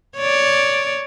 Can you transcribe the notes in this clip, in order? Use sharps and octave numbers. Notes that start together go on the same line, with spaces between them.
C#5 D5